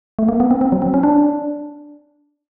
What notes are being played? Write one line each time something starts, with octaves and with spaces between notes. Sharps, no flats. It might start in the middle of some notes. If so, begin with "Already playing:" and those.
A3
A#3
B3
C4
C4
F#3
C4
C#4
D4